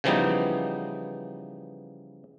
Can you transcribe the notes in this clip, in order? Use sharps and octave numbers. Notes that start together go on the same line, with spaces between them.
C#3 E3 F3 G3 B3 D#4